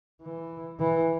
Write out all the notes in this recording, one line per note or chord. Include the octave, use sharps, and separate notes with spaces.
E3
E3